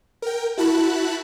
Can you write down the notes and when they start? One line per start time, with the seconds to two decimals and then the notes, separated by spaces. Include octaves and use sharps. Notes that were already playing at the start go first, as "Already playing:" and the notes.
0.22 A#4 G5
0.57 E4 F#4 A5 B5 F#6